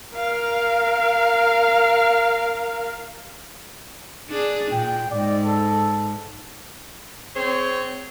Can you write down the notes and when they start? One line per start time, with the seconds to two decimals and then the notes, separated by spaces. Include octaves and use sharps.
0.16 A#4 F5
4.30 D4 G#4
4.72 A#2 G5
5.11 G#2 D5
5.44 A4
7.34 C4 G#4 C5 C#5